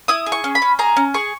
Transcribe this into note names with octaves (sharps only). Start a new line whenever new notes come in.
E4 D#6
G#4
C#6
C#4
B5
C#4
G#4 A#5
C#4
G#4 C#6